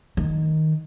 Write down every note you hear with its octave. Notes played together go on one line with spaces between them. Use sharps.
D#3